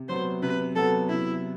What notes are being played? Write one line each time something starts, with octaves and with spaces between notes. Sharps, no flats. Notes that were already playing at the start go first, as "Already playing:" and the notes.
Already playing: C3
F#3 B3 C5
C3 B4
F#3 B3 A4
C3 E4